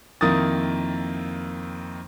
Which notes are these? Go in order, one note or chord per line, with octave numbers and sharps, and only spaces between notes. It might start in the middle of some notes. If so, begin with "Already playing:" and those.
F2 D#3 A#3 E4 D#6 A6